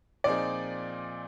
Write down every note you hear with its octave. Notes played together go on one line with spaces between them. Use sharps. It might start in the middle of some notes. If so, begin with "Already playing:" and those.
A#2 F3 C4 D#4 G#4 D5